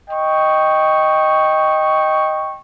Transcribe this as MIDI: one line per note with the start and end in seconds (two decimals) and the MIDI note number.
0.10 2.58 75
0.10 2.58 79
0.10 2.58 85